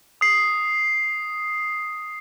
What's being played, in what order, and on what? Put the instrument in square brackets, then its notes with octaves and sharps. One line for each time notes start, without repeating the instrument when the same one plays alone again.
[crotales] D#6 C7